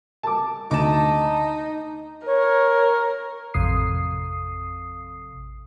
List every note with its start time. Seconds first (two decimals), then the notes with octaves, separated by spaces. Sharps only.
0.23 A5 D6
0.71 D2 D#4 A5 D6
2.26 A#4 C#5
3.54 A1 F2 C3 D#6 C7